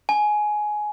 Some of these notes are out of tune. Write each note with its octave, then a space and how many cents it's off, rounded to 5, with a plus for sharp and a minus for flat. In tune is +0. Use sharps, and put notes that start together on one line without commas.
G#5 +15